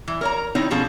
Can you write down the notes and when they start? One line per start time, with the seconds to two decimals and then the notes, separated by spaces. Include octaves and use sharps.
0.08 E3
0.21 A#4 C#5 A#5
0.55 D#3 C4 D#4 E4 C#5
0.71 B2 D3 F3 C#4 G#4 A5